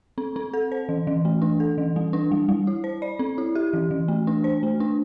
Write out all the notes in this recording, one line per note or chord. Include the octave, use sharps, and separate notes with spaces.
C4
C4
A4
C5
E3
E3
A3
D4
A4
E3
G3
D4
G3
G3
E4
C5
D5
C4
E4
G4
E3
E3
A3
D4
C5
A3
D4